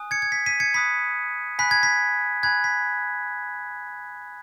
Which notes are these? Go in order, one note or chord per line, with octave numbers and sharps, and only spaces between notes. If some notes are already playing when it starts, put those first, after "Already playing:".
Already playing: G#5 D#6 F#6
G#6 C#7
G#6
B6
B6 D#7
G#6 C#7
B5 D#6 F#6 B6
G#5 B5 F#6 B6
G#6
B6
G#5 B5 F#6 G#6
B6